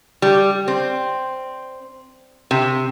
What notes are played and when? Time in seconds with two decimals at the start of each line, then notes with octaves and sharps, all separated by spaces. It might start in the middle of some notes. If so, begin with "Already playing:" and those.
0.22 G3
0.68 C4
2.51 C3